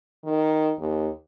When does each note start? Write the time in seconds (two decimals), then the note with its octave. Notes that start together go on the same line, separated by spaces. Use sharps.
0.24 D#3
0.78 D#2